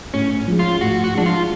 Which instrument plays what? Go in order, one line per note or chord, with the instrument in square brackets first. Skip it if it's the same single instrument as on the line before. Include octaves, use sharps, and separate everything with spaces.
[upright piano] A2 [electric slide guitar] C#4
[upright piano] F3 G#3
[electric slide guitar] F4
[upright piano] A2 [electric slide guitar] F#4
[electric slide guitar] F#4
[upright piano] F3 G#3 [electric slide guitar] D4
[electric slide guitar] F4